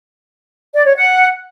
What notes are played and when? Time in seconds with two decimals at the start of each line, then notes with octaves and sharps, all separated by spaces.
0.74 D5
0.85 C#5
0.96 F#5